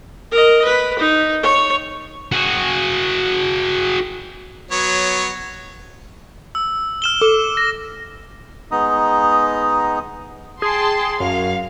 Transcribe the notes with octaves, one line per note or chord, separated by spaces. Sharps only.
A#4 D#5
B4
D#4
C#5
F#4 G#4
F#3 B3 C#5
E6
F6 E7 G7
A4 D6
A#6
G#3 B3 D#4 D#5 A#5 D#6
G#4 G5 A5 C6
F#2 F#4 F5